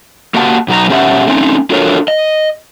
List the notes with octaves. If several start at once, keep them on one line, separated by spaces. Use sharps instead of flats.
A#3 F#4 G4 F#5 A5
B2 F#3 D#4 C5 A#5
B2 C#4 G4 A#4 E5 F#5
A3 C4 C#4 D#4
D4 F4 F#4 A4 A#4 C#5
D#5